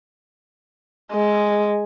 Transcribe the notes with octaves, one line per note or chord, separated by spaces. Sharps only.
G#3